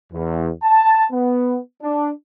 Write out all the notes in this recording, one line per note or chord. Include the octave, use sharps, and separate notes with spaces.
E2
A5
B3
D4